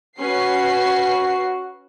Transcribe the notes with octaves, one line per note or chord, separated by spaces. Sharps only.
C#4 F#4 B4 C7